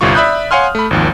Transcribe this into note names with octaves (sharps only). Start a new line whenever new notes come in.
G1 C2 G3 F4 C#6
D5 E5 B5 D#6 F#6 G6
C#5 F5 F#5 G#5 C6 F6
A3 B5
G#1 D#2 F3